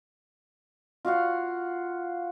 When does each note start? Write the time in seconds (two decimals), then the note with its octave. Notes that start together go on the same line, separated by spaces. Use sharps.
1.05 F4 F#4 F5 F#5